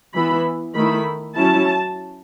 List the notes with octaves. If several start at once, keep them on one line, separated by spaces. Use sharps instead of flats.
E3 B3 E4 B5
D#3 A3 E4 B5
F#3 C#4 E4 A5